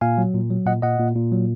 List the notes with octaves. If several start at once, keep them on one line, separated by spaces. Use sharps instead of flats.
A#2 F5 G#5
F#3
A#2
F#3
A#2 D#5 F#5
A#2 D#5 F#5
A#2
A#2
F#3